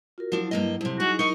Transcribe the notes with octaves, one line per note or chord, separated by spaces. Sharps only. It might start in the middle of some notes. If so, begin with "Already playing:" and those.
F4 F#4 A#4
F3 F#3 D4 E4
G2 A#3 D#5
F2 C3
D#4 F#4 G#4
D#4 A#4 D#5 C#6